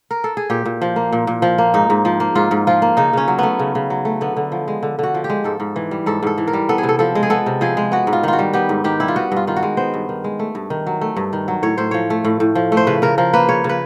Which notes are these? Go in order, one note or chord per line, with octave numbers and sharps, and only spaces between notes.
A#4
A4
G#4
A#2 G4
A#2
F3
A#3
A#2
A#2
F3
A#3
G#2 D#4
G#2
F3
A#3
G#2 F4
G#2
F3 F4
A#3
C#3 D#4
C#3 C#4
F#3
A3 B3
C#3
C#3
F#3
A3
D3 B3
D3
F3
G#3
D3
D3 F#4
F3
G4
G#3
G#2 A4
G#2
E3
G3
G#2 A4
G#2 A4
E3
A#4
G3
B3 A4
G#4
C3
A4
F3 A4
G#3
G#4
B3 A4
C3
F3 G#4
G#3
B3 F#4
G#2
F4
D#3 F4
F#4
G3
B3 G4
G#2
D#3 G4
G3 E4
F4
B3 F#4
G2 F4
D#3 F4
F#4
G#3
B3 C5
G2
D#3
G#3
A3
G2
D#3
F#3
A3
G2
D#3
F#3
A2 C#5
A2 C5
F3 C#5
A3
A2
A2
F3
A3
C5
C#3 B4
C#3 A#4
F3 A#4
A#3 B4
C#3 C#5
C#3
B4